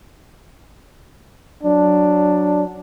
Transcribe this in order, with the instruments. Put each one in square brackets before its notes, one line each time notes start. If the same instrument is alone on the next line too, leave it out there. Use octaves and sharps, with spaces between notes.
[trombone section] F#3 D4